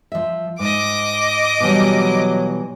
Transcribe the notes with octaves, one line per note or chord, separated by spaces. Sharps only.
F3 E5
G#2 D#5 D6
B2 E3 F#3 G3